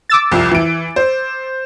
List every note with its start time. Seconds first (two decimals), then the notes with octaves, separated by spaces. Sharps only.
0.09 D6 E6 A6
0.32 C2 F2
0.51 E3 D7
0.96 C5